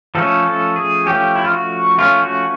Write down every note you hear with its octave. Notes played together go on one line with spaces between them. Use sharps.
F3 A3 C#4 A4
A4
G#4
F3 A3 C#4 G4
E4
F4
F#4
F3 A3 C#4 F4
F#4